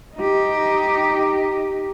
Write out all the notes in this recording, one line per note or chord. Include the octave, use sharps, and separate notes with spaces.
D#4 G4